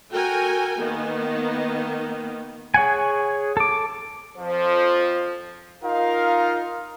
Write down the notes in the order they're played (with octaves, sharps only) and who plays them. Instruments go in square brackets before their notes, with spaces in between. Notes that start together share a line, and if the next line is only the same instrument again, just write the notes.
[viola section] F#4 A4 A#4 G5 G#5
D#3 A#3 B3
[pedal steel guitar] G#4 C#5 F#5 G#5
A4 D6
[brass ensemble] F2 F3 C5
D#4 F4 A#4 F5